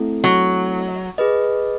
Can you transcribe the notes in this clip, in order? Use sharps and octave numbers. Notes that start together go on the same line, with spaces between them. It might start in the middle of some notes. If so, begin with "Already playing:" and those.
Already playing: A3 C4 E4 A4
F#3
G#4 B4 D#5